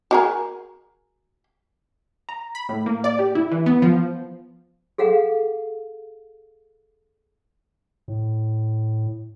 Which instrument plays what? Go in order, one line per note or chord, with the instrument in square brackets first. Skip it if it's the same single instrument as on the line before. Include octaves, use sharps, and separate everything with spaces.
[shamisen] F#4 G#4 A#4
[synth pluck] A#5
B5
A2
A#3
D5
G4
E4
E3
B3
F3
[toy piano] G#4 A4 F5 F#5
[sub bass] A2